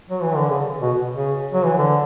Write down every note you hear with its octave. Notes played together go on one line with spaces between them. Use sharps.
F#3
E3
D3
C#3
B2
C#3
F#3
E3
D3